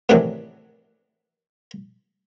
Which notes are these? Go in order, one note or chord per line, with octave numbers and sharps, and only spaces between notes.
A2 C3 D#3 E3 F#3 D4